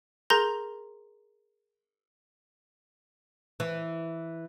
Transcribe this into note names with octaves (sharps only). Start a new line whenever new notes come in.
G#4 A#4 A#5 C6 G6 A#6
E3